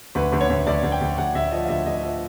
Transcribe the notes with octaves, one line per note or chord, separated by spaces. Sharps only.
D2 B4
D2
C#5
D2
D2 D5
D2
G5
D2
D2 F#5
D2 E5
F3 D#5
F5
D2 E5
D2 D#5
F3 E5